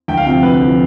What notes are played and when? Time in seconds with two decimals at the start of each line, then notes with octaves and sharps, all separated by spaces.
0.08 D2 G5
0.17 F5
0.26 C3 F3 G5
0.43 D2 B4
0.60 C3 F3